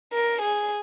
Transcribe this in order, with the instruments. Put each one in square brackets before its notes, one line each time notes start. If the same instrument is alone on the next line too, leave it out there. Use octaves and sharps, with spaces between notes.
[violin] A#4
G#4